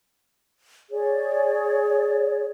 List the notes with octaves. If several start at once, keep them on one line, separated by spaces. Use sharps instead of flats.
G#4 C#5 D5